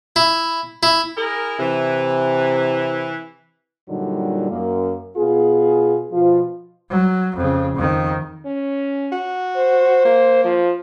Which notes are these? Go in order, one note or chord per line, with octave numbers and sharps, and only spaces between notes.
E4
E4
E4 G#4 A#4
C3 E3
G2 A#2 D3 F#3 G3 D#4
F#2 A#3
B2 B3 F4 G#4
B2 F3 F4
F#3
F2 C#3
F2 D#3
C#4
F#4
C5
A#3
F3